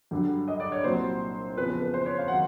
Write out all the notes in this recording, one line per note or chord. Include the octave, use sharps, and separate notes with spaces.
G2 D3 F#3
D#5
D5
C#5
C2 A#2 F#3 C5
E2 C#3 F3 B4
B4
B4
C5
C#5
F5
D#3 F#3 F#5